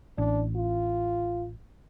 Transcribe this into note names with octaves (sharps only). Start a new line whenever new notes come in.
A1 D4
F4